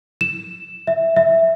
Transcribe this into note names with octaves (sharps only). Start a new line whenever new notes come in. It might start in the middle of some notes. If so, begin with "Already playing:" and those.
E7
E5
E5